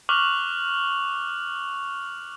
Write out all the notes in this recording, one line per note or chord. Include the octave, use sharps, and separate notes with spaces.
C#6 D6 F6 F#6 F7 F#7